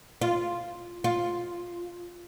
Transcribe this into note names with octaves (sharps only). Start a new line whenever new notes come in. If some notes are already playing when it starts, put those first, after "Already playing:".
F4
F4